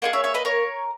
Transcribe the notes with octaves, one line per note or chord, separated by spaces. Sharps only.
A#3 E4 G#4 D#5 F#5
C#5 E5
C#5 E5
B4 D#5
A#4 C#5